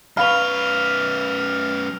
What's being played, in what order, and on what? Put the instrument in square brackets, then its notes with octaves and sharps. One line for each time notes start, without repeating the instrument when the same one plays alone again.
[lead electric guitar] F#2 B4 [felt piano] F5 B5 C#6 [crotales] F6 F7